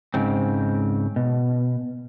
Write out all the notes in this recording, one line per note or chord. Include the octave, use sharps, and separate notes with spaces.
G#2 C#3 C4
B2